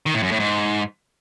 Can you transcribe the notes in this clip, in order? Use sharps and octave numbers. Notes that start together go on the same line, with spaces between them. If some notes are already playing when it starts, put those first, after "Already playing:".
D#3
A2
F#2
A2
G#2